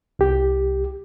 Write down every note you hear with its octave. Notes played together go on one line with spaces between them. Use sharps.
C2 G4